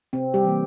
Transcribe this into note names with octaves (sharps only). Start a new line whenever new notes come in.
C3 C4
G3 G4
E3 G3 A#3